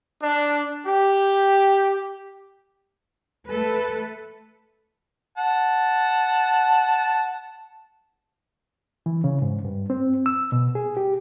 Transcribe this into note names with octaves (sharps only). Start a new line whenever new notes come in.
D4
G4
A3 A4 B4
F#5 A5
E3
C#3
G#2
G2
C4
E6
B2
G#4
G4